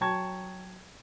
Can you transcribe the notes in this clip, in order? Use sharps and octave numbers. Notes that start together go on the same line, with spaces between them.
F#3 G5 A5 C#6 G#6